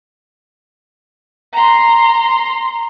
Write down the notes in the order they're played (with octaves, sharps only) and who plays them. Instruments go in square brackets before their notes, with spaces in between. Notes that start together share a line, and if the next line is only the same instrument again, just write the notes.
[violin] A#5 C6